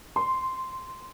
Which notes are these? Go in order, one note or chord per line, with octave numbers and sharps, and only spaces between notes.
C6